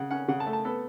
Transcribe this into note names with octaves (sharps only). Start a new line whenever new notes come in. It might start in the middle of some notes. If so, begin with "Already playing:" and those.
Already playing: C#3 F#5
C#4 F#5
C#3 F#5
A5
A3
A5
B3 A4